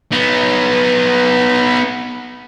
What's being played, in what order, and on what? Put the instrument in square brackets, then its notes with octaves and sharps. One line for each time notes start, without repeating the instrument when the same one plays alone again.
[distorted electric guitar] B3 D#4